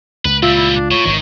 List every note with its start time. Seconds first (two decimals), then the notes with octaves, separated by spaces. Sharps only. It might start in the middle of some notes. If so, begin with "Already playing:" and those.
0.25 C#2 B4
0.43 A#2 G3 F4 E5
0.56 E4
0.75 D4
0.91 A2 C#5
1.05 G#1 D#3 E3